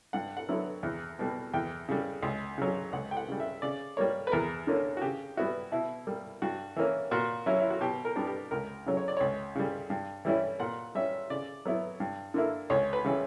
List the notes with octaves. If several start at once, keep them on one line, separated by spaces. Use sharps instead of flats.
G2 F#5
F#5
D3 F#3 B3 E4
E2
B2 G3
E2 G5
C#3 G3
C#2
C#3 F#3
C#2 F#5
G5
F#5
C#3 G3
E5
C#3 D5
G3 A#3 C#5
B4
E2 A#4
D3 A#3 C#4
F#4
C#3 G4
G3 B3 E4 F#4
B2 E4
G3 A#3
G2 F#4
E3 A#3 C#4
A#2 F#4
F#3 C#4 E4
E4
F#4
B2 G4
A#4
G3 B3 D4
G4
C#2 A#4
C#3 F#3 C#4
C#5
D5
C#2 C#5
C#3 G3
G2
E3 G3 C#4 E4
A#2 F#5
G3 C#4 E5
C#3 D5
F#3 B3 E4
G2
D3 A#3 E4
C#2 C#5
B4
C#3 E3 G3 C#4